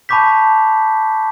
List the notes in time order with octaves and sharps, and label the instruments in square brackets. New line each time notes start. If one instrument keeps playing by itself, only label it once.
[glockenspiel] A5 B5 C#6 D6 G6 B6